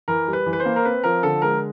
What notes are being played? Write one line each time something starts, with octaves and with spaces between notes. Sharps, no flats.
E3 A#4
G3
B4
E3
B4
C5
A#3
A#4
C4 B4
F3 A#4
D3 A4
G#3 A#4